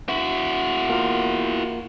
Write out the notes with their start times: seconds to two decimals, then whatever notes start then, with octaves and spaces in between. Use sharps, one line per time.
0.09 E4 F#4
0.90 A#3 F4 A#4